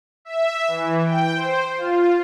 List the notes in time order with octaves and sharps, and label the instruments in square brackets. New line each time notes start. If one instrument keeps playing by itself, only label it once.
[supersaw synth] E5
E3
G5
C5
F4